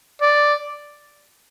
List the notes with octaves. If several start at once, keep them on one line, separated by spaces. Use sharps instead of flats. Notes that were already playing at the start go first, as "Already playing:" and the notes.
D5